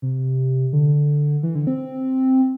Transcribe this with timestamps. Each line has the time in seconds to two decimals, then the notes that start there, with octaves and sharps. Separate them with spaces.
0.02 C3
0.73 D3
1.43 E3
1.55 D3
1.67 C4